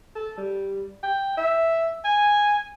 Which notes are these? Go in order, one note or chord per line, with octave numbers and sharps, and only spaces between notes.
A4
G3
G5
E5
G#5